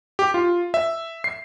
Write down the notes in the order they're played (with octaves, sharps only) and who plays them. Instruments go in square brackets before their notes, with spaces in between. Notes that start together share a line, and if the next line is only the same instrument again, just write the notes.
[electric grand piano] G4
F4
E5
C7